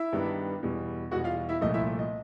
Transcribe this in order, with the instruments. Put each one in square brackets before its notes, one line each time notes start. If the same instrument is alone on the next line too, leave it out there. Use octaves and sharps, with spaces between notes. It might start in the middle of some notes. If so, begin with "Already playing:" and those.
Already playing: [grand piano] E4 E5
G2 D#3 G3 B3 D4
E2 B2 G3
E2 B2 G3 F#4 F#5
F4 F5
E4 E5
C2 A#2 F3 A3 D#5
E4 E5
D#5